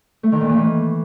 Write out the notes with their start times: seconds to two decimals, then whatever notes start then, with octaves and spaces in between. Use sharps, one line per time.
0.23 A3
0.32 D#3
0.41 A#2
0.49 E3
0.58 A3